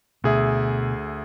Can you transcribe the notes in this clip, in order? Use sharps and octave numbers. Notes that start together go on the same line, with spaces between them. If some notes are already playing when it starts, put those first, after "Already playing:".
D2 B2 G#4 E5